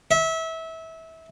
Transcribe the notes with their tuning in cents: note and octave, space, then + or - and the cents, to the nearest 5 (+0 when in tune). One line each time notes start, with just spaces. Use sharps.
E5 -25